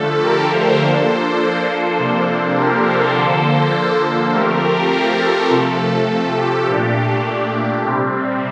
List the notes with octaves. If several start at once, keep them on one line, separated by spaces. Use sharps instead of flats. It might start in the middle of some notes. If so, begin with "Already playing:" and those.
Already playing: D3 F3 A3 A4
G4 A#4
A4 C5
F3 A#3 D4 A4 C5
C3 F3 A#3 D4
G4 A#4
A4 C5
D3 F3 A#3 A4 C5
F3 A3 C4 G4 A#4
G4 A#4
A4
C3 F3 A3
A4
G4
A#2 A3 D4
C3 G3 C4